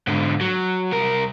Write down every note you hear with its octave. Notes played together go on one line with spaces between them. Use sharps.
G#2 D3
F#3
C2 A#4